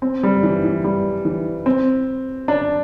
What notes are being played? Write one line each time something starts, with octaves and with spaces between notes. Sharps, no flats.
C4
G3
E3
E3
G3
E3
C4
D4